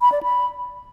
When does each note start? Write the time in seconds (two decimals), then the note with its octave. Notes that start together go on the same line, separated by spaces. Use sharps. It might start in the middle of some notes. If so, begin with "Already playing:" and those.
0.01 B5
0.12 D5
0.23 B5